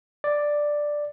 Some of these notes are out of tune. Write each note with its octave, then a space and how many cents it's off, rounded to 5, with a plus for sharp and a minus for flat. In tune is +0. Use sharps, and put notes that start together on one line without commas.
D5 +5